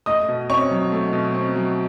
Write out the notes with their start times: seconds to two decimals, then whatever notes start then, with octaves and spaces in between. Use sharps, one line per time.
0.06 A3 D#5 D#6
0.29 B2
0.49 C4 C#5 C#6
0.71 F#3
0.92 A3
1.13 B2
1.35 C4
1.56 F#3